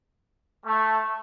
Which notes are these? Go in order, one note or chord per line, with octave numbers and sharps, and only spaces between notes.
A3